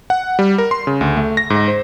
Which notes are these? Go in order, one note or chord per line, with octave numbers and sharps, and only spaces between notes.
F#5
G3
A#4
C6
C#3
D2
A3
A#6
G#2
C5